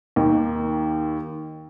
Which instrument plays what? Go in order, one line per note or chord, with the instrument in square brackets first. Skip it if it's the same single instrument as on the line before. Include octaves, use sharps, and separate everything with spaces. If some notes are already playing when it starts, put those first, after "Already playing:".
[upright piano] D#2 D#3